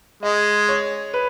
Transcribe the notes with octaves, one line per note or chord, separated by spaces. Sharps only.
G#3 D#5
C#5
B4